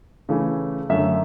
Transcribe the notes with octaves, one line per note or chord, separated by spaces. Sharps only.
C#3 E3 A3
F#2 D3 F#3 A3 E5